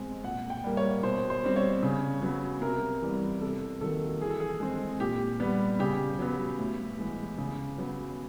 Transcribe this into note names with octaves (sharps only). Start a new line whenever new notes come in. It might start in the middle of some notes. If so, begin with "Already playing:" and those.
Already playing: B2 G#3 C4
A#2 F#5
G5
G3 A#3
C#5
B2 C5
C5
G3 C4
C#5
C#3
F#3 B3
C3 A#4
E3 G3 B3
C3 A4
D#3 F#3 A#3 A4
E3 G#4
A4
G#4
G#3 C4
A#2 G4
G3 B3
C#3 G4
F#3 B3
A2
E3 G#3 B3
C#3
F#3 B3